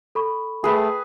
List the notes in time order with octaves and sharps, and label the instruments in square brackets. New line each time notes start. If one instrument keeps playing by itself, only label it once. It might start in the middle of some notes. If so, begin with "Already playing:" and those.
[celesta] A4 B5 C#6
[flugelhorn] A3 [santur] G#4 B4